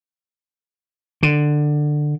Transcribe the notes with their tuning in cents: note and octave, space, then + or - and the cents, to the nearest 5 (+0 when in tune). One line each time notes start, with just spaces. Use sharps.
D3 +15